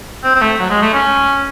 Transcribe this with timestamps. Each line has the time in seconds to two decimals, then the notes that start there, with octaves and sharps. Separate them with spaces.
0.24 C4
0.35 C4
0.41 A3
0.59 F#3
0.70 G#3
0.82 A3
0.93 C#4